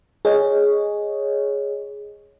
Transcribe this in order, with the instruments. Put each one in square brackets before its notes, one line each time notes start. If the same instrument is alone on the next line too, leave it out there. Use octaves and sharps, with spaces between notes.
[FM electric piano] G#4 C#5 D#5